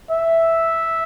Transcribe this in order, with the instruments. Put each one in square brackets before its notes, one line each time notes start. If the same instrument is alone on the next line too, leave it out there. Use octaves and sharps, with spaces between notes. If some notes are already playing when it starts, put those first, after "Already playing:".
[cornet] E5